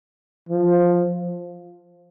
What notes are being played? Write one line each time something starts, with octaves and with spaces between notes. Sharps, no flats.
F3